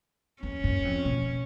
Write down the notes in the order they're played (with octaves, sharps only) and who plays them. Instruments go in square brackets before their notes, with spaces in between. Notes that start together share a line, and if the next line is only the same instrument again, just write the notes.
[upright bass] E2 [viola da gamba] C#4
[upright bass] F#2
F2
B2